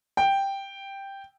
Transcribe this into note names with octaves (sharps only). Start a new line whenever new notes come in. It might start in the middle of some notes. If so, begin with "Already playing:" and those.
G5